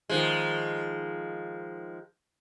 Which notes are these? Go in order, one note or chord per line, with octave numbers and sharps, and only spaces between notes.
D#3 F3 G#3